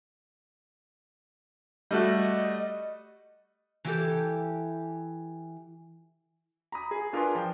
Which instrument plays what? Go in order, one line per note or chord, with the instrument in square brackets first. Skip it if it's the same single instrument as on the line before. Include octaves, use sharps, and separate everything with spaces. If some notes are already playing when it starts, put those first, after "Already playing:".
[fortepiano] G3 A3 F#4 [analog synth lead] D#5
[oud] E3 G4 A4
[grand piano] A#5 B5 D#6
G#4
D4 F4 A#4 B4 G#5 C6
F3 G5